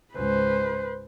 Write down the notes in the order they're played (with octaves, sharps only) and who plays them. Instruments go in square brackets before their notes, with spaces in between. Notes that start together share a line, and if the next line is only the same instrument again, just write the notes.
[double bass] C#2 G#2 [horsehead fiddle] B4 C5